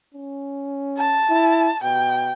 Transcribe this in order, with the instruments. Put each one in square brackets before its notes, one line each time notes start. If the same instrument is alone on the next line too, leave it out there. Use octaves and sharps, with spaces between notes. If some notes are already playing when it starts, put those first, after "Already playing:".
[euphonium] C#4
[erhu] A5
[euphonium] E4
[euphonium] B2 [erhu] G5